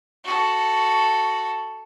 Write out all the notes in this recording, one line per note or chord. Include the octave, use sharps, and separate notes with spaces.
F#4 A4